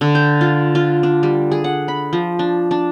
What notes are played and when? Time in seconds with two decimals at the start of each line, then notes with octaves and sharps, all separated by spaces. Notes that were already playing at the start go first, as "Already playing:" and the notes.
0.01 D3
0.15 G5
0.41 F4
0.75 F4
1.03 D4
1.23 G3
1.52 G#4
1.64 F#5
1.88 B5
2.13 F3
2.39 D4
2.71 D4